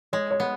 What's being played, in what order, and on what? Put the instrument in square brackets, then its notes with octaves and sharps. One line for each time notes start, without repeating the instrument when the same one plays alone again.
[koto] G#3 [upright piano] C#5
[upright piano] C#5
[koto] B3